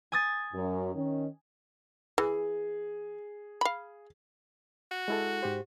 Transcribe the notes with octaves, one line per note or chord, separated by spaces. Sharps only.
G#5 D#6 A6
F#2
D#3 C#4
E3 G#4
F5 B5
F#4
G#3 E4 A4
G#2 G4 C5